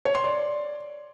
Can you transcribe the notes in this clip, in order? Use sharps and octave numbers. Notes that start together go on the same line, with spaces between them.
C#5
C6
D5